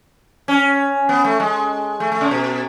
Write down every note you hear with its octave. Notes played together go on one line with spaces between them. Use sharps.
C#4
B3
A3
G#3
A3
A3
C#3
B2